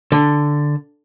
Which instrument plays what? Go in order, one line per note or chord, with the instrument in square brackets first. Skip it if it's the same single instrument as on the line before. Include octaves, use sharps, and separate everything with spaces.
[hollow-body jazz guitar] D3